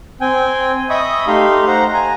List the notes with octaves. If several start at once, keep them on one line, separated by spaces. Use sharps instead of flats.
C4 G5 G#5
D#5 E5 B5 C#6 D#6
A3 D#4 G4 F5 C6
C5 F#5 A#5
G#5 A#5